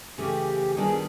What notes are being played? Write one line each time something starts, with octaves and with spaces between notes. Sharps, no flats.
C#3 E3 A3 G4
D#3 G3 B3 D4 F4 G#4